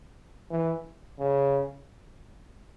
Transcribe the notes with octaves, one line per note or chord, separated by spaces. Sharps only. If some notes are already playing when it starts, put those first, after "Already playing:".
E3
C#3